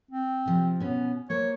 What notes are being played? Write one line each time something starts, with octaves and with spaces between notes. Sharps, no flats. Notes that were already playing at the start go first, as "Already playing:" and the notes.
C4
C3 F3
B2 B3 C#4
A#3 C5 C#5